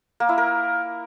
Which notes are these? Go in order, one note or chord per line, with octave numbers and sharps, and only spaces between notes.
A#3
E4
A#4